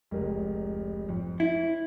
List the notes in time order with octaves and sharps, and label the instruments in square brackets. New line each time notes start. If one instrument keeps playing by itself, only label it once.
[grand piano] F1 C#2 A#4
F2
[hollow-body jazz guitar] E4